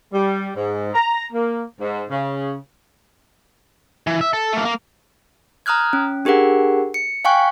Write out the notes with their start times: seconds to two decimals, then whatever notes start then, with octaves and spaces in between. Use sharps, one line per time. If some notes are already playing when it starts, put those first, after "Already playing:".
0.13 G3
0.56 G#2
0.93 A#5
1.32 A#3
1.80 G#2
2.10 C#3
4.07 E3
4.21 E5
4.33 A4
4.53 A3 A#3
4.65 A#3
5.66 A#5 D#6 F6 F#6 G#6
5.93 C#4
6.25 D4 G4 G#4 A#4 F#5
6.94 C#7
7.25 F5 G5 G#5 C#6 F#6